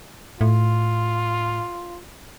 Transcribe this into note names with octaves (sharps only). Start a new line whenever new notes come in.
A2 F4